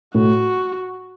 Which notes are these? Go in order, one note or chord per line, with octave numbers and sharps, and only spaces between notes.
A2 F#4